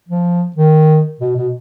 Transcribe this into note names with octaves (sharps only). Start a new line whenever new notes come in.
F3
D#3
B2
B2